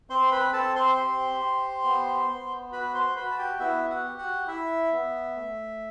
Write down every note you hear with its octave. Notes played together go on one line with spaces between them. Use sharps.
C4 C5 C6
B4 B5
C4 A4 A5
C5 C6
G4
G4
B3
B3
F#4 B4 B5
C5 C6
F#4 B4 B5
A5
G4 G5
B3 E4 E5
F#4 F#5
G4
F#4 F#5
E4 E5
B3
A3